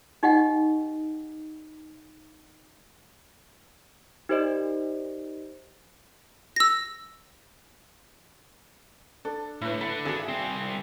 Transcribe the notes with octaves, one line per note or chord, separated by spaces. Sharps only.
D#4 G4 D#5 F#5 G5
D#4 G4 A#4 C5 D5 D#5
E6 A#6
D4 A4
A2 E4 B4
A4 F#5 B5
G#1 F#4 G#4 E7
C2 C4